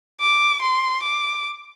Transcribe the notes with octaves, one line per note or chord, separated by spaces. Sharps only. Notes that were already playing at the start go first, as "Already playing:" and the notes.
D6
C6
D6